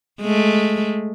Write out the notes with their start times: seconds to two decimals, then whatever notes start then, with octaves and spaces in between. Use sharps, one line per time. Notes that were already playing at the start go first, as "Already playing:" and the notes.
0.21 G#3 A3